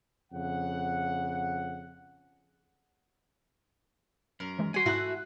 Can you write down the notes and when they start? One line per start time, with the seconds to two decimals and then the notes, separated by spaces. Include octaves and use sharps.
0.32 F2 C#3 F#5
4.40 F#2 A#4
4.58 D#3 E3 G#3
4.74 G3 F#4 F#5 G#5 C6
4.86 G#2 A3 E4 F#4 F#5 F#6